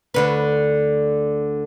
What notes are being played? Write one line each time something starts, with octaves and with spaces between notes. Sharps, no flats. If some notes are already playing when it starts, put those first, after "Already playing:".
D2 D3 B4